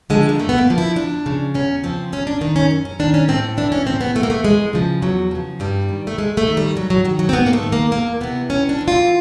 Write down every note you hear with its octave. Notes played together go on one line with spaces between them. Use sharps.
D3 F3 G#3
A#3
F#2 A3
B3
A#3
D3 F3
E4
E2 D4
C#3 F3
E2 C#4
C#3 F3 C4
F#2 C#4
D4
D#3 D#4
C#4
F#2
C#4
D#3 D4
C#4
A2 C4
E3 D4
C#4
A2 C4
B3
E3 A3
A#3
A3
E2 G#3
C#3 F3
E2 F#3
C#3 F3
G2 G3
D#3
A3
G2 G#3
A3
D#3
G3
G#2 F#3
F#3
D#3 F#3
F#3
C4
G#2 B3
A#3
A3
D#3
A#3
E2 A#3
C3 E3 B3
E2 C#4
D4
C3 E3
F4